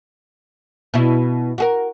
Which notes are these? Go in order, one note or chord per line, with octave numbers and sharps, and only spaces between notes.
B2 E4
F#4 G#4 A#4